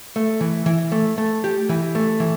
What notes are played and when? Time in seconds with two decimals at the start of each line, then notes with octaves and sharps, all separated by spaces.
0.16 A3
0.41 E3
0.66 E3
0.92 A3
1.18 A3
1.44 G4
1.69 E3
1.95 A3
2.20 E3